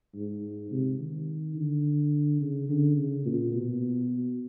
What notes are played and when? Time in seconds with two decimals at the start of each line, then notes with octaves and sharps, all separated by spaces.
0.15 G#2
0.71 C3
0.99 D#3
1.56 D3
2.41 C#3
2.69 D3
2.97 C#3
3.26 A#2
3.54 B2